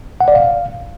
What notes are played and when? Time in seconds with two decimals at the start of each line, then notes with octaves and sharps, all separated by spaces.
0.21 F#5
0.28 D5
0.35 F5